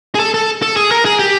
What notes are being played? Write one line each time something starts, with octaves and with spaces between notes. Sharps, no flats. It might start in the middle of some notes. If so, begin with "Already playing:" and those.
G#4
A4
A4
A4
G#4
A#4
G#4
G4